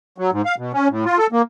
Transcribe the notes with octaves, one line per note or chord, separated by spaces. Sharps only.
F#3
G#2
F5
B2
C#4
A2
F4
A4
A#3